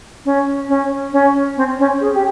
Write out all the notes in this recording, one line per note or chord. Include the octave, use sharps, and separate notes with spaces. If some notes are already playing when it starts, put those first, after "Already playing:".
C#4
C#4
C#4
C4
C#4
G#4
G4